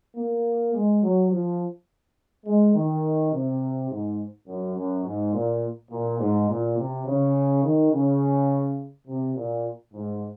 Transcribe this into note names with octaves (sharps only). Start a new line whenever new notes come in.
A#3
G#3
F#3
F3
G#3
D#3
C3
G#2
F#2
F#2
G#2
A#2
A#2
G#2
A#2
C3
C#3
D#3
C#3
C3
A#2
G#2